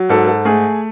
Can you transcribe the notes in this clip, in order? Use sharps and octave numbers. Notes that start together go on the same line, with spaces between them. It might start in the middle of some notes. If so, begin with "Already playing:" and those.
Already playing: F#3
G#2 A4
A4
A3 G#4